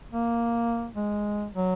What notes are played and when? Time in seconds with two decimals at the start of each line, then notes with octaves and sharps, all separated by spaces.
0.11 A#3
0.96 G#3
1.54 F#3